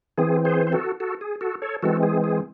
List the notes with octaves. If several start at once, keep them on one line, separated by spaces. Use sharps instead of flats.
E3 C4 G#4
G#4 C5
C5
F#4 A4
F#4 A4
G#4
F#4 A4
A4 C#5
E3 G#3 C4 F#4 A4
G#4
G#4